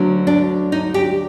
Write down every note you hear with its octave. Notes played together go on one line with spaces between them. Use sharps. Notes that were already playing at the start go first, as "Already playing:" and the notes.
Already playing: D2 D3 F#3
D4
D#4
G4